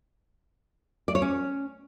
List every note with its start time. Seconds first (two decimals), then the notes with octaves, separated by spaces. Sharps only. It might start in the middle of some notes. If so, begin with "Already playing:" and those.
1.08 D5
1.15 C#5
1.22 C#4